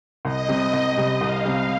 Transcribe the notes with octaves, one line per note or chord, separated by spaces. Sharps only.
C2 D#5
C3 G3
C2
C3 G3
C2 F5
C3 G3